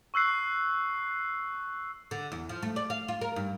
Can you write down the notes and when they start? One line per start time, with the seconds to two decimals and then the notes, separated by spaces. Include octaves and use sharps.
0.14 C#6 E6 F#6 C7
2.11 D3
2.32 E2
2.49 F3
2.63 A3
2.76 D5
2.90 F5
3.08 F4
3.21 A#4
3.36 G2